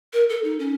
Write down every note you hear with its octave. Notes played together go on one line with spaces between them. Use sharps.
A#4
A4
D#4
C#4